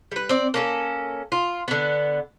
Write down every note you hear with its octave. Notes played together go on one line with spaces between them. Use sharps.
G3 B4
C4 D5
A#3 C#4 A4
F4
D3 B3